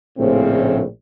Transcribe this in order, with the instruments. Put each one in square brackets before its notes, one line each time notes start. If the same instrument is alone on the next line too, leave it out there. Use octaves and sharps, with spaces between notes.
[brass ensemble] A#1 A2 C#3 C4